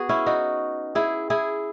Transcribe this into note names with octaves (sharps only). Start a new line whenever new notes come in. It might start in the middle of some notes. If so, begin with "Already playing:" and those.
Already playing: B3 F#4 G#4
C#4 E4
D#4 F#4
E4 G#4
E4 G#4